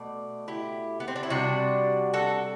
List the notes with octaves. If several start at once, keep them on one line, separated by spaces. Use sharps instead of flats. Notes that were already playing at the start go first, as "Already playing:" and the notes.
Already playing: B2 A3 D5
E4 G4
B3
C4
D4
E4
C3 G3 D4 F#4
F#4 A4